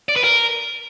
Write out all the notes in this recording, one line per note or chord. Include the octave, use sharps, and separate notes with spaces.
D5
B4
A#4